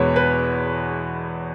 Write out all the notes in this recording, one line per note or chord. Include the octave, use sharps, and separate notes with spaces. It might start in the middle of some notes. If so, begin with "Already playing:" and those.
Already playing: E2 B2 G#3 B4 C#5
B4